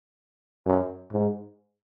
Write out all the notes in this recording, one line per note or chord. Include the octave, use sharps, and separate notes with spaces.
F#2
G#2